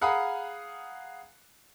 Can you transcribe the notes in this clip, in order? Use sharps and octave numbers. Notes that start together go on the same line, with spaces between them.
G#4 F5 F#5 A#5 B5 D#6